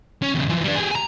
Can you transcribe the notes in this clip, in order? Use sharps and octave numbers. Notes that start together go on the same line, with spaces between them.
C#4
E2 C#3
E3 F3
G3 D4
G4 G#4
G#5 A#5